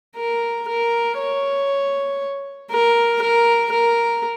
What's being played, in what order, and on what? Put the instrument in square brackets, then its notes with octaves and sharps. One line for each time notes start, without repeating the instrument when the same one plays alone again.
[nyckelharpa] A#4
A#4
C#5
A#4
A#4
A#4